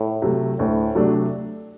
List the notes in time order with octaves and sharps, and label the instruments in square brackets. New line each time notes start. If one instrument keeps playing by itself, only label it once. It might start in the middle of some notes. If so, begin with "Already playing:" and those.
Already playing: [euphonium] A2
[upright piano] C3 F#3 A3
[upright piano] D2 [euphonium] A2
[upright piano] C3 F#3 A3 D4